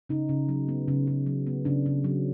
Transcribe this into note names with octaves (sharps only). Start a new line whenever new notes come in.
C#3 D#4
C#3
F#3
B3
C#3
C#3
F#3
B3
C#3 D4
C#3
F#3